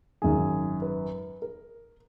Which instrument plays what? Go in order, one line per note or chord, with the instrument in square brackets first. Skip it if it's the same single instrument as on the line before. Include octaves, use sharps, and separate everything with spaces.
[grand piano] G#1 F#2 D#3 G#4
B4
A#4